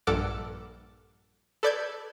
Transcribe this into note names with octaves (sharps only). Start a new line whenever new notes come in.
A#1 G2 A4 F#5 D6 F6
A4 B4 D5 D6 G6 G#6